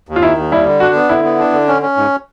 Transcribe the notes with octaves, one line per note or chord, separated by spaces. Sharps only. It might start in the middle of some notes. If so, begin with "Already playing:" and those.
D#2
F4
D#3 E4
D#2
G3 E4
D3
D4 F#4
B3
D3 E4
B3
D4
D3
C#4
C#4
G#2